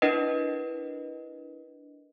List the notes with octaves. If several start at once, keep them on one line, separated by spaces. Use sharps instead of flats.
D4 E4 A#4 B4 D#5